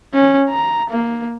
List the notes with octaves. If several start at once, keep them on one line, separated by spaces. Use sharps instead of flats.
C#4
A#5
A#3